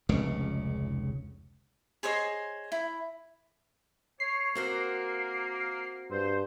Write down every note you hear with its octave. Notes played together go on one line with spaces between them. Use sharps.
F1 C#2 C#3
G#4 C5 C#5 D#5
E4
C#5 C7
A#3 C4 F#4 A#4
G2 C5